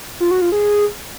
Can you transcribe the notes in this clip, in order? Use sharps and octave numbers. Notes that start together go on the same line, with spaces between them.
F4
F#4
F4
G#4